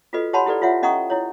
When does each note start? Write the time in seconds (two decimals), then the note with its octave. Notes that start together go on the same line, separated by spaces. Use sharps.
0.13 F4 F#4 A4 B4 D#5
0.33 G4 C#5 F#5 A5 B5 C6
0.46 E4 G4 A4 B4 D5
0.62 F4 C#5 E5 F#5
0.82 C#4 D#5 F#5 A#5 C#6 D#6
1.10 E4 C#5